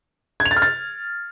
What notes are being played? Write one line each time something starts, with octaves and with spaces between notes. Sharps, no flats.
G#6
F7
A6
F6
A6